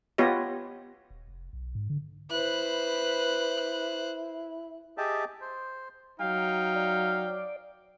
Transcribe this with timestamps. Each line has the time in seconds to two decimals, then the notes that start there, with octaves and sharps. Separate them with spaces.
0.18 B3 F4 G4 C#5 D#5
1.10 D#1
1.28 F1
1.53 B1
1.75 G#2
1.90 D3
2.31 E4 B4 C5 F#6
4.98 G4 G#4 D#5 E5 G5 A5
5.41 C5
6.20 F#3 D#4 F5 G5
6.75 D5